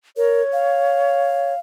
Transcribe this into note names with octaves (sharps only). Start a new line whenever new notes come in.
A#4 C#5
F5